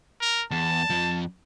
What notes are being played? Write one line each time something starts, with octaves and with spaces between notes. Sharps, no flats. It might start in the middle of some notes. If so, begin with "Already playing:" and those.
A#4
E2 A5
F2 F3